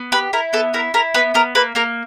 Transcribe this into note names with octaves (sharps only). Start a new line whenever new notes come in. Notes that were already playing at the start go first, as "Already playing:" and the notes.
Already playing: B3
G4 B4
E4 A#4
B3 A4
E4 A#4
E4 A#4
B3 B4
B3 A#4
A#3 B4
A#3 A#4